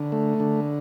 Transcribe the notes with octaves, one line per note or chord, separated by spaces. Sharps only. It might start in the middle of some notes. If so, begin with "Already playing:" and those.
Already playing: D3
A3
D3